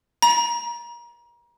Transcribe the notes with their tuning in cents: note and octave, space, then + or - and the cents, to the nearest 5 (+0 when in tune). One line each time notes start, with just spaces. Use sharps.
A#5 +30